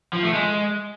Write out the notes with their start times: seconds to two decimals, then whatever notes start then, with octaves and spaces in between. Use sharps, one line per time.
0.13 F3
0.23 A3
0.33 G#3